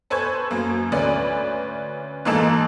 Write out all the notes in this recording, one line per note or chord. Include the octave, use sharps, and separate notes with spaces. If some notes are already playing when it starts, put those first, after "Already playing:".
A4 B4 C5 G#5 C#6 G#6
F#2 A#3
D2 C#4 B4 D5
G#2 E3 A#3 D#4 A4 E7